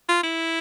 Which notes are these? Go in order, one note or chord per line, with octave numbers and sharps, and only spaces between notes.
F4
E4